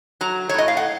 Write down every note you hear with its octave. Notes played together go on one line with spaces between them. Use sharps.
F#3 A#5
C#5
A2 D#5
F5
F#5